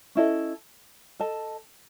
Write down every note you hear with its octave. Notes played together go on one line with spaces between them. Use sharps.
C#4 E4 A4 D#5
A4 D#5 A5